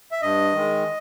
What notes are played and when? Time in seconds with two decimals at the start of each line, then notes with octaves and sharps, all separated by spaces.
0.12 E5
0.22 G2 D#5
0.53 D#3 G#3